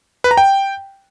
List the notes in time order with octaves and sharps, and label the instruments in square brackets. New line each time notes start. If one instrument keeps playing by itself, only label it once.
[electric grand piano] B4
A#5
G5